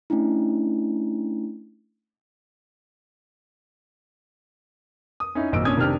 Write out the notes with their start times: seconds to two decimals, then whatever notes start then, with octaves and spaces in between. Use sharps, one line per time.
0.10 A3 C#4 D4 E4
5.20 D#6
5.35 C#4 D#4 E4
5.52 G#1 F#2 A#2 D#5 E6 D7
5.65 A#2 C#4 D4 D#6 G#6
5.77 F1 C3 D#3 D4 G4 F6